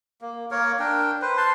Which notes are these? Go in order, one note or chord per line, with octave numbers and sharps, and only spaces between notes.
A#3
A#3 A#4 C#5
D4 A#4 G5
B4 C5
A5 C6